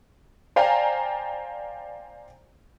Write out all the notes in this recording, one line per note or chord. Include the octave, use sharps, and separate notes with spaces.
C5 D5 F5 G5 G#5 A#5